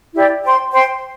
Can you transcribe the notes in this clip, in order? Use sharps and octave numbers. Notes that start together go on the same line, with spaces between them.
E4 G4 D5
C5 G5 C6
C5 G5 C6